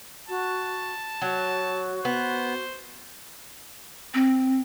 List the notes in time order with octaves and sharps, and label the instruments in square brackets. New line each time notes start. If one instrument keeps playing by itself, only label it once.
[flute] F#4 [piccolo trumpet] A5
[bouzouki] F#3 [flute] F#4
[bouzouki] B3 [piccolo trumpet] C5
[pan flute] C4